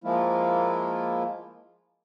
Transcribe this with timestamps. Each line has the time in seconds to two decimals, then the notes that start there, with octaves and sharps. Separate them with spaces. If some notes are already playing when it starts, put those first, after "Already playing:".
0.04 F3 G#3 A#3 E4 F4